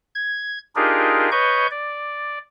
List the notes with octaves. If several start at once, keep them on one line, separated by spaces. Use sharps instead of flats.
G#6
D4 D#4 F4 G4 G#4 A#4
B4 C#5 D#5 C#6 G6
D5